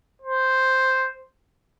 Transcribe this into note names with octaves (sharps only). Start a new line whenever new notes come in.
C5